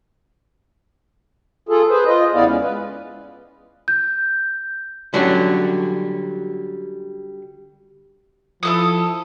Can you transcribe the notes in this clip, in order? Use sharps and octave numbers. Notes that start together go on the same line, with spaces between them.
F4 G#4 A4
G#4 B4 C5
F4 D#5
E2 C#3 B3 E4 D5 F5
G#3 C#4
B4
G6
D3 F#3 G3 C#4 F#4
F3 E4 A4 D#6